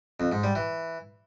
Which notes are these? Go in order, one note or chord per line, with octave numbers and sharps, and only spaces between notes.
F2
G#2
G3
E3